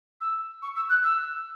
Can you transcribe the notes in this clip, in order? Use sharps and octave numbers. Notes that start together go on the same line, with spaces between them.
E6
C#6
E6
F#6
E6